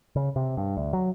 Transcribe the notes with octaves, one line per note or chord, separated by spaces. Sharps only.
C#3
C3
G2
D2
F#3